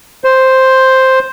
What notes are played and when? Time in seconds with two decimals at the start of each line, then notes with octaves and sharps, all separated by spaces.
0.24 C5